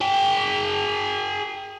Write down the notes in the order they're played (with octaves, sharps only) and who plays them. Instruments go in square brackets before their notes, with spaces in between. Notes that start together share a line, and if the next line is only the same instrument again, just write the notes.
[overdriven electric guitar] G#4 G5